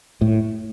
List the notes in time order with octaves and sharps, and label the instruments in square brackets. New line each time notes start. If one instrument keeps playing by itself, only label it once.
[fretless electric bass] A2